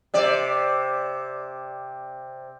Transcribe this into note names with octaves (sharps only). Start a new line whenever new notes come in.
C3 D5